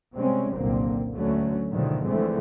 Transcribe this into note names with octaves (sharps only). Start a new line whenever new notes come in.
C3 G3 G#3 C4 C#4
F#1 C2 A#2 D3 A#3 C4
D2 D3 F#3 A3 C#4
G#2 B2 D3 D#3 F3 A3
D3 E3 F3 G#3 A3 C4